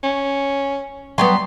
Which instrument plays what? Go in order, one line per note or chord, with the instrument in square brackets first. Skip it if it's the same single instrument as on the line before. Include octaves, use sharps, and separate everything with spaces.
[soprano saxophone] C#4
[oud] F#3 G3 B3 [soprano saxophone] C6